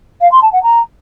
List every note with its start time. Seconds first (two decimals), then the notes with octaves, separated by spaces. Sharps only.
0.21 F5
0.32 C6
0.42 A5
0.53 F#5
0.63 A#5